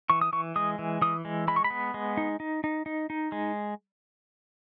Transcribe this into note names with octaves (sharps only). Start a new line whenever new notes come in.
E3 C#6
D#6
E3 C#6
G#3 D#6
E3
E3 D#6
G#3
G#3 B5
C#6
B5
B3
G#3
D#4
D#4
D#4
D#4
D#4
G#3